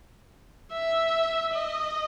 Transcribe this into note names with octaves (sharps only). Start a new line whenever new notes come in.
E5
D#5